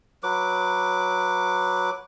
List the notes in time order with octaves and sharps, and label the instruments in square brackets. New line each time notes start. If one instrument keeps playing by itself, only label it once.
[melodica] F#3 B4 D6